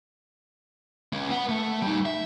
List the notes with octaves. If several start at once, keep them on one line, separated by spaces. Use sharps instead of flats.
G#3 C#4
B4 F#5
A3
G3 D#4
E5